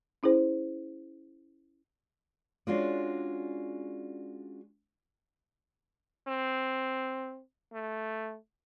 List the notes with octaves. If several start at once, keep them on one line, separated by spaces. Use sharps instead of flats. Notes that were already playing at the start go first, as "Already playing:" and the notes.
C#4 E4 G#4 C5
G#3 C#4 D4 F4 F#4 D5
C4
A3